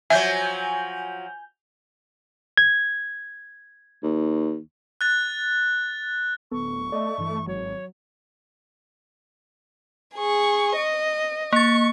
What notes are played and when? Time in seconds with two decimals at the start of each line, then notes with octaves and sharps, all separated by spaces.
0.10 F3 F#3 E5 G#5 G6
2.57 G#6
4.03 D#2
5.01 F#6 A6
6.51 D1 B3 A4 C#6
6.92 A3 D5 D#5
7.18 G2 E3
7.47 G#1 F#3 C#5
10.15 G#4 C#6
10.77 D#5
11.53 A#3 C#6 A6